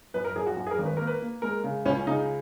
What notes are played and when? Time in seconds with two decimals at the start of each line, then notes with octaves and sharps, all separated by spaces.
0.14 F#2 B4
0.25 A#4
0.36 F#2 G#4
0.46 F#4
0.57 F#2 F#4
0.67 G#4
0.71 A#4
0.79 G#1
0.86 B4
0.97 A#3 A#4
1.07 B4
1.21 A#3
1.42 G#3 A#4
1.64 C#3
1.85 C#2 C#4
2.07 C#3 D#4